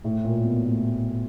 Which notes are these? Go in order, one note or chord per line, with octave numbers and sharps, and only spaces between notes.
A2
A#2
B2
A2